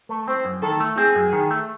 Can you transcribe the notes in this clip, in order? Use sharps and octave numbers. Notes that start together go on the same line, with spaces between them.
A3
C4 C5
F#2
D#3 A4
A3
C4 G#4
F#2
D#3
A3